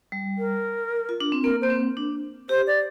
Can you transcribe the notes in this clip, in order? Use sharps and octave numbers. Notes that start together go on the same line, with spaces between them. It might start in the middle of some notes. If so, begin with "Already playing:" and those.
G3
A#4
F4
D4
C4
A#3 A#4
A#3 C5
C4
D4
G4 C5
D5